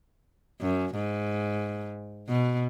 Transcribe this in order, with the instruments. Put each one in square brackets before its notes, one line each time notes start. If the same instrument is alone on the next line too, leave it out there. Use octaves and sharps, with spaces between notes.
[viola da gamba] F#2
G#2
B2